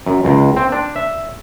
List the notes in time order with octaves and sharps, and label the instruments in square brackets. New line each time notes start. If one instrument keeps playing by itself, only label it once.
[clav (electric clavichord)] F#2
C#2
C4
D4
E5